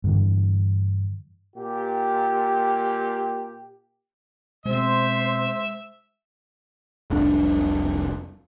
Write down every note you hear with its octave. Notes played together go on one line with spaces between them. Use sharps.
G2 D3 E3
A#2 G4
B2 G#3 C4 C5 E5
F1 C2 D4